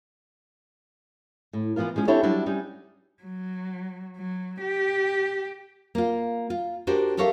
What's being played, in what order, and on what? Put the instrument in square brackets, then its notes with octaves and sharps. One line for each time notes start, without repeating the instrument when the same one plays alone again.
[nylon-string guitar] A2
E3 F3 B3 F4 A#4
F3 G#3 C#4
C4 D4 E4 G4 A4 C#5
F#3 G3 D4 E4
G3 C#4 D#4
[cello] F#3
F#3
G4
[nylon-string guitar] A#3 F4
F4
D4 F#4 G4 A#4 C5
G4 A4 A#4 C#5 E5 F5